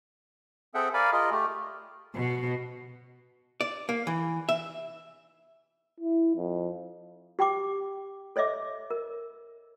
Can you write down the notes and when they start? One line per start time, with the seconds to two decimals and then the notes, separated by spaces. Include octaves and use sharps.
0.74 C4 G#4 A4 E5 F#5 G5
0.94 A#4 D5 F5 G#5 B5
1.12 F4 G#4 A#4 D#5
1.31 A3 G4
2.16 B2
3.61 D5
3.89 A#3
4.07 E3
4.49 E5
6.00 E4
6.36 F2
7.39 G4 G5 C6 D6
8.36 A4 C#5 D#5 E5 D6
8.91 A#4